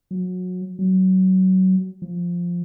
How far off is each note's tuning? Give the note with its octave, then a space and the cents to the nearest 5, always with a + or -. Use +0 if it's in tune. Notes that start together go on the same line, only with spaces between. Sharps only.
F#3 -25
F#3 +20
F3 +0